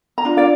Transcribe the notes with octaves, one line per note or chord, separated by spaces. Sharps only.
A#5
D4 F4
D5 F5